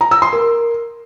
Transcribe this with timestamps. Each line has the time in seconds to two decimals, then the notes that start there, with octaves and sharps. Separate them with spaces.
0.01 A#5
0.11 E6
0.22 C6
0.33 A#4